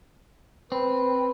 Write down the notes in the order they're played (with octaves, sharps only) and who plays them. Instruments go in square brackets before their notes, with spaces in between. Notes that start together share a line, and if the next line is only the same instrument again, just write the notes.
[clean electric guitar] C4 [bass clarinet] B4